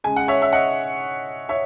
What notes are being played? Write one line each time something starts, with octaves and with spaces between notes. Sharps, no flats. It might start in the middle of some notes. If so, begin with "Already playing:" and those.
C#3 G#3 G#5
F#5
C#5 E5
E5
D#5 F#5
C#5 E5